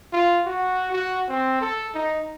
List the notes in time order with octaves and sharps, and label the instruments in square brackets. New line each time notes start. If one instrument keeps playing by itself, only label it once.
[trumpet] F4
F#4
F#4
C4
A4
D#4